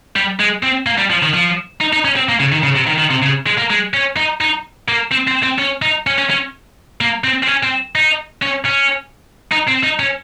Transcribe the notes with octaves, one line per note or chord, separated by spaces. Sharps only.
G3
G#3
C4
A#3
G3
F3
D#3
F3
D#4
D#4
C#4
C4
A#3
C#3
D#3
C#3
C3
D#3
D#3
C3
C#3
G#3
A#3
G#3
C#4
D#4
D#4
A#3
C4
C4
C4
C#4
D#4
C#4
C#4
C#4
A#3
C4
C4
C#4
C4
D#4
C#4
C#4
D#4
C4
D#4
C#4